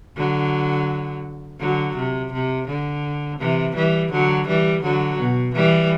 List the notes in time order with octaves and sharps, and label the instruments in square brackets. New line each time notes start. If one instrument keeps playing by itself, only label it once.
[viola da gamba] D3 F#3
D3 F#3
C3
C3
D3
C3 E3
E3 G3
D3 F#3
E3 G3
D3 F#3
B2
E3 G3